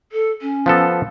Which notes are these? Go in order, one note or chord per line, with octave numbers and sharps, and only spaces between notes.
A4
C#4
F3 B3 A4